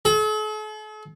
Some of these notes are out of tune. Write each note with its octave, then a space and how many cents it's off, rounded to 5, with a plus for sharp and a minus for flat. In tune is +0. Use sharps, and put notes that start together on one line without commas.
A4 -45